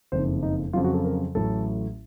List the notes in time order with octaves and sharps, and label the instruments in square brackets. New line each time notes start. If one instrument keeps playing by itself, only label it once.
[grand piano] F#1 F2 D#3 C5
D#4
F2 C#3 F#3 F4
F#4
A4
A#4
A1 A2 F#3 A4